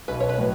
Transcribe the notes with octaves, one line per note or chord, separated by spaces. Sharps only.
B1 B4
C#5
B4
A2 F#3